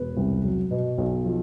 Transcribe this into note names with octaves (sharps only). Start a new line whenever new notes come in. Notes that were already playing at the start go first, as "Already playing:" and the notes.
Already playing: E1 B4
C2
F#3
B2
B1
F3